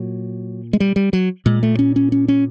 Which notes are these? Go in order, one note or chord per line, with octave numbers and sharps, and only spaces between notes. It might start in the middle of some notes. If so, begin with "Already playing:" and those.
Already playing: A#2 F#3
G#3
G3
G3
F#3
A#2 G#3
A3
C#4
C#4
C#4
C#4